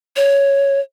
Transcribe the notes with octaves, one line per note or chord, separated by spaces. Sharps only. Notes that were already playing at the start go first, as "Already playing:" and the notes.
C#5